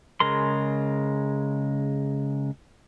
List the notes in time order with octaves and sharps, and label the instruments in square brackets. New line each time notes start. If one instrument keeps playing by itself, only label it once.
[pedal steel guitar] C#3 G#3 A#4 C6